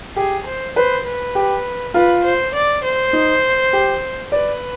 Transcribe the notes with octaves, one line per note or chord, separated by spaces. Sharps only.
G4 G#4
C5
B4 C5
B4
G4
F4 B4
C5
D5
C5
D#4
G4
B4 D5